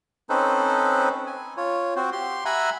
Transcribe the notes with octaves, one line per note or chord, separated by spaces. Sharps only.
C4 C#4 D#4 A4 B4 C5
G#5
F4 C#5
C4 F#4 C5
G4 C6
E5 F#5 G#5 A#5 B5 E6